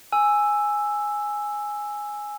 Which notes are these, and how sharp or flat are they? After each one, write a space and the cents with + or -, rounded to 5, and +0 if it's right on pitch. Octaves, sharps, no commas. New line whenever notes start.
G#5 +0 E6 +0